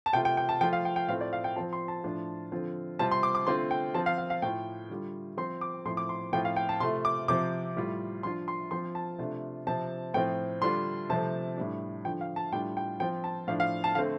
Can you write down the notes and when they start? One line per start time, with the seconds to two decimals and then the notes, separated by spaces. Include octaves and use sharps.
0.06 A5
0.13 C3 A3 F4 G5
0.25 G5
0.37 G5
0.49 A5
0.61 F3 A3 F4 G5
0.73 F5
0.85 G5
0.96 G5
1.08 A2 A3 C4 F4 F5
1.21 D5
1.33 F5
1.44 G5
1.56 F3 C4 F4 A5
1.73 C6
1.88 A5
2.04 A2 F3 D4 F4
2.52 D3 F3 C4 F4
2.99 C3 G3 C4 F4 A5
3.11 C6
3.23 D6
3.35 D6
3.47 D3 A3 C4 F4 C6
3.71 G5
3.95 F3 C4 F4 A5
4.06 F5
4.18 F5
4.30 F5
4.42 A2 A3 F4 G5
4.90 D3 G3 F4
5.37 F3 C4 F4 C6
5.61 D6
5.86 A2 F3 C4 C6
5.97 D6
6.09 C6
6.33 A2 F3 C4 F4 G5
6.45 F5
6.56 G5
6.69 A5
6.80 C3 A3 F4 C6
7.05 D6
7.28 C3 F3 C4 F4 D6
7.76 A2 G3 F4
8.23 F3 D4 F4 C6
8.48 C6
8.71 F3 C4 F4 C6
8.95 A5
9.19 C3 A3 D4 F4
9.67 C3 F3 C4 A5
10.14 A2 F3 C4 F4 G5
10.62 D3 G3 D4 F4 C6
11.09 C3 F3 A3 C4 A5
11.57 A2 G3 D4
12.05 D3 F3 D4 F4 G5
12.21 F5
12.36 A5
12.53 A2 G3 D4 F4 G5
12.77 G5
13.00 F3 C4 F4 G5
13.24 A5
13.47 A2 F3 D4 F5
13.60 F5
13.84 A5
13.95 D3 A3 C4 F5